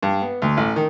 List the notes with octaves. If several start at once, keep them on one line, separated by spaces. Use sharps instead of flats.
G2
B3
D2
A1
D#3